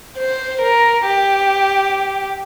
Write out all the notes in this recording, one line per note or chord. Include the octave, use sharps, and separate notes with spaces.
C5
A#4
G4